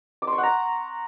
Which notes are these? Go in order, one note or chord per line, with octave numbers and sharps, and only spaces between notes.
D6
C6
C#6
F#5
A#5